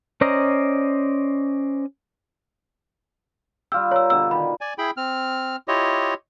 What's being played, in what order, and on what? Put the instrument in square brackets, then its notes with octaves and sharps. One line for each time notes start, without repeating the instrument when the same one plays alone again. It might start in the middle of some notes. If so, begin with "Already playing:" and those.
[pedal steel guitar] C#4 C5 D5 D#5 A#5
[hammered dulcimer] G3 F4 G4 [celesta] E6 F6
[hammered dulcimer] A#4 [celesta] C#5 E6
[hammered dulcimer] B2 D3 G3 [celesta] E6
[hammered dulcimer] D#3 [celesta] B5
[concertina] D5 G#5
E4 G#4 G5 B5
C4 F6
E4 F4 G4 C#5 D#5